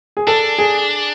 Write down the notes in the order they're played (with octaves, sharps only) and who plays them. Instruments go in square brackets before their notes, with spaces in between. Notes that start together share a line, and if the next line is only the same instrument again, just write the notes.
[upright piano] G#4
[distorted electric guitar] D4 [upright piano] A4
[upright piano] G#4